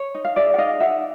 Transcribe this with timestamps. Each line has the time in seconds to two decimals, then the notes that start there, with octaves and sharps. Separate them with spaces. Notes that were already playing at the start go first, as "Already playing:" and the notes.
Already playing: C#5
0.15 D#4
0.25 F5
0.36 G#4 D5 E5
0.54 F#5
0.58 D#4 D#5 F5
0.80 D#4 E5 F#5